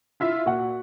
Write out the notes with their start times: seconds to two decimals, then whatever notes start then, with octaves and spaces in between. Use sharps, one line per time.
0.20 E4 F4 E5
0.46 A#2 F#4 F#5